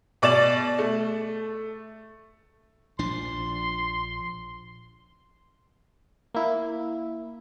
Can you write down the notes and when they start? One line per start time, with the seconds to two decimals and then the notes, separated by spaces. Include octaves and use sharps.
0.22 B2 D5 D6 A6 E7 F#7
0.78 A3
2.99 A#1 F3 D4 C6
6.34 A#3 E4